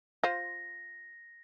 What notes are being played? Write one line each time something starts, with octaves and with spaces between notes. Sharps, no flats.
F4 C5 A#6